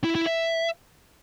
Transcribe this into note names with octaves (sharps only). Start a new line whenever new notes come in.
E4
E4
E5